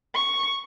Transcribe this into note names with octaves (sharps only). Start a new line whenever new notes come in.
C#6